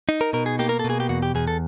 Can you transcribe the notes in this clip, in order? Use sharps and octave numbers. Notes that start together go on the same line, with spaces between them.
D#4
A#4
B2 A#4
G#4
A#3 G4
A#4
A4
B2
G#4
G4
E2 F#4
G4
E2 G#4
A4